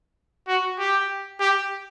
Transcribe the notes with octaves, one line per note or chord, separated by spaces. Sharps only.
F#4
G4
G4